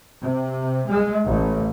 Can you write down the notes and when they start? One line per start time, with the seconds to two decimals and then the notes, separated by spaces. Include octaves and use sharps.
0.22 C3
0.88 G#3
1.26 A1